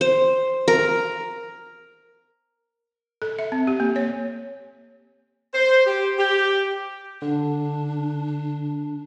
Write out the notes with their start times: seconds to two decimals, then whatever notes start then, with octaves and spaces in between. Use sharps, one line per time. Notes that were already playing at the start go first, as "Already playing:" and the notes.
0.01 C5
0.68 A#4
3.22 A4
3.39 E5
3.52 C4
3.67 G4
3.80 A#3
3.96 C#5
5.54 C5
5.86 G4
6.18 G4
7.22 D3 D4